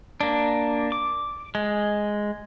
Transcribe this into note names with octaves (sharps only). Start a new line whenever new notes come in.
A#3 D4
D6
G#3